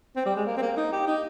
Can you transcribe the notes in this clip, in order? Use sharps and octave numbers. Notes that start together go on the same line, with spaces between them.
C4
G3
G#3
A#3
C4
A#3
D#4
G4
D#4